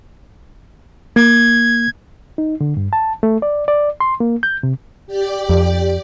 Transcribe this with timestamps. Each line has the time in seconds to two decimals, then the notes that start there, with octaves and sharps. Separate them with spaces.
1.16 A#3 G#6
2.38 D#4
2.61 D3
2.77 G2
2.93 A5
3.23 A3
3.42 D5
3.68 D5
4.00 C6
4.20 A#3
4.43 G6
4.63 C3
5.07 G4 D5
5.49 F2